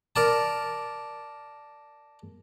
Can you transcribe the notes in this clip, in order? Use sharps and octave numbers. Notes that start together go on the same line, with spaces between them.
A#4 D5 A5